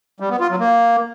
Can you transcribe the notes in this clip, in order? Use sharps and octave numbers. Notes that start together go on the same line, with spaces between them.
G3
B3
F4
F#3
A#3